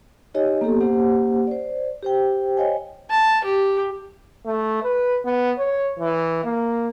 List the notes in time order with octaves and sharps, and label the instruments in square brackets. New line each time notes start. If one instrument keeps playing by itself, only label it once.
[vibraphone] D#4 G4 C#5 D#5 G#5
A#3 B3 G4 A4
A#3 C#4 G4 C5 F#5
C5 D5
G4 C5 G5
C5 C#5 D#5 F5 G5 G#5
[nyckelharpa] A5
G4
[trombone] A3
B4
B3
C#5
E3
A#3